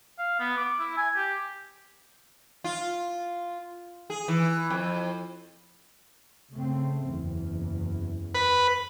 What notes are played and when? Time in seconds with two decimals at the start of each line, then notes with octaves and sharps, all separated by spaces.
0.19 F5
0.40 B3
0.57 D6
0.79 E4
0.97 G#5
1.16 G4
2.64 F4
4.10 G#4
4.28 E3
4.70 F2
6.53 C#3 A3 C4
7.07 F#1 E2
8.35 B4